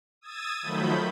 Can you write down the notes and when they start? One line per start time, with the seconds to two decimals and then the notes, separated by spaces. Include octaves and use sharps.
0.21 D#6 E6 G#6 A6 D#7
0.62 D#3 F3 F#3 A3 B5 G6